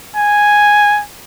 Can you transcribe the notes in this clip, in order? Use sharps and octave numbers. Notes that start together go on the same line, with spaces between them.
G#5